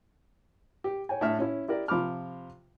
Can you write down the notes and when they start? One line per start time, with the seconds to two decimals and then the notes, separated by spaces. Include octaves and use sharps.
0.84 G4
1.09 C#5 G5 G#5
1.21 A2 D4 E5 F6
1.39 C#4 E4
1.68 E4 G4 A#4 D5
1.88 C3 F3 B5 D6 F6